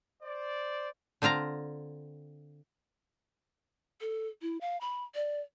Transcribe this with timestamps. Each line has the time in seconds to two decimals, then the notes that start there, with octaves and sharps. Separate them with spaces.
0.23 C5 D5
1.22 D3 C4 F4 F5 A#5
4.01 A4
4.42 E4
4.61 F5
4.81 B5
5.15 D5